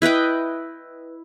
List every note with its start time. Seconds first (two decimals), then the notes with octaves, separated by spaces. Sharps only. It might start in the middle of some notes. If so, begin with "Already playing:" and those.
0.02 E4 B4 D#5 G5